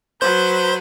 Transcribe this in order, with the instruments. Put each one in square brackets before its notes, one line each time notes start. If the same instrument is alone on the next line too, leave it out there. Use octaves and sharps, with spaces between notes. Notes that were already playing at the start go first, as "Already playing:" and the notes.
[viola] F#3 B4 [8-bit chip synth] C5 G6